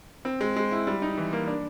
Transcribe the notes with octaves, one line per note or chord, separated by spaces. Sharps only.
C4
G#3
G#3
E4
G3
D#4
E3
A#3
D4